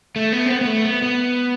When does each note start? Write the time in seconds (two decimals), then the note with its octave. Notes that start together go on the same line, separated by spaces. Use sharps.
0.16 A3
0.33 B3
0.46 C4
0.50 B3
0.61 B3
0.67 A3
0.85 B3
1.02 B3